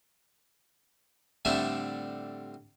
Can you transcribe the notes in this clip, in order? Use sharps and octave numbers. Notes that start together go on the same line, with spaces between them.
A2 D3 G3 A3 C4 E5